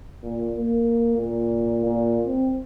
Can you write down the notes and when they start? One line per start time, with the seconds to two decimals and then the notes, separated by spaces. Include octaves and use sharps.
0.23 A#2
0.56 A#3
1.18 A#2
1.85 A#2
2.27 C4